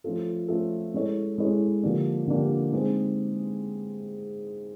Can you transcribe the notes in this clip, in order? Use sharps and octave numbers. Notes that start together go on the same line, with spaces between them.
F3 A3 C#4 F4 A4
F3 A3 C#4 F4 A4
G#3 C#4 E4 A4 C#5
G#3 C#4 E4 A4 C#5
D3 F3 A#3 D4 G4
D3 F3 A#3 D4 G4
G#3 C4 D#4 G#4